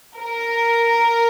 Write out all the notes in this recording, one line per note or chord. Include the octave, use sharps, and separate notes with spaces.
A#4